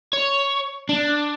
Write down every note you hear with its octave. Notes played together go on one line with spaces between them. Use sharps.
C#5
D4